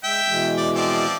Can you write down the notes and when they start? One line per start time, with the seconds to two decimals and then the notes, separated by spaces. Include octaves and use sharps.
0.04 G#3 E5 G5
0.28 B2 E3 G#3
0.57 D5
0.76 F3 C4 D5